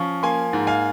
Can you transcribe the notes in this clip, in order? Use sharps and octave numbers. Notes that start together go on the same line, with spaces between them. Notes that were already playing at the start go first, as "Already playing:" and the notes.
Already playing: F3 C#4 C#6
A#3 G#5 C6
G#2
F5 G#5